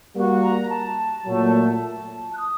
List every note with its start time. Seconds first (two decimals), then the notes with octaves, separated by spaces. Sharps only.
0.14 G3 A#3 F#4
0.42 A#5
0.70 A5
1.26 A#2 F#3 A3
1.82 A5
2.33 F#6
2.38 D#6